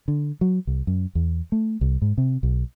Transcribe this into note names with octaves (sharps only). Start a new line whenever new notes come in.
D3
F#3
C2
F#2
E2
A3
C2
G#2
C3
B1